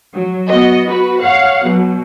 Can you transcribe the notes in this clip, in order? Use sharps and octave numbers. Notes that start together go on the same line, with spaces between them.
F#3
B3 F#4 D#5
F#4 B4
C#5 F5 F#5
B2 F#3